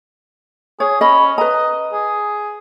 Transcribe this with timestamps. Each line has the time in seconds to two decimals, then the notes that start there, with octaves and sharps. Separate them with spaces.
0.80 G#4 C#5
1.01 C#4 D#5 B5
1.38 B4 D#5 A#5
1.93 G#4